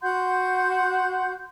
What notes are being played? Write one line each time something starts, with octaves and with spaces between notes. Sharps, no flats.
F#4 F#5 C6 G6